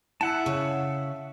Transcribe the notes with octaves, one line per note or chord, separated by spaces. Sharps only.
E4 E5 F#5 A5
C#3